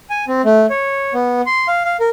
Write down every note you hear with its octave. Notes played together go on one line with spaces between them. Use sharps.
G#5
C4
A3
C#5
B3
C6
F5
F5
A#4